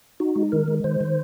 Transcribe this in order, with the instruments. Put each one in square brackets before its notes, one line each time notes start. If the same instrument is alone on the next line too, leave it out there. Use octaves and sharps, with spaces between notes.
[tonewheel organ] D#4 F#4
G#3
D#3 A#4
G#3
D#3 C5
D#3